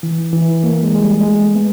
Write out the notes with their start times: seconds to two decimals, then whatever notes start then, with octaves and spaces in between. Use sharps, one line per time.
0.03 E3
0.33 E3
0.63 A#3
0.83 G#3
0.95 G#3
1.03 G3
1.19 A3
1.23 G#3
1.43 A3
1.55 B3